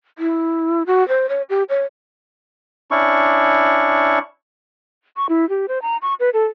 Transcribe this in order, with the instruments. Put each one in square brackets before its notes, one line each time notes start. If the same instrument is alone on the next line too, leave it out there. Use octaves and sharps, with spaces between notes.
[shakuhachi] E4
F#4
C5
C#5
G4
C#5
[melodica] C#4 D4 E4 C#6
[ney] C#6
E4
G4
C5
A#5
C#6
B4
A4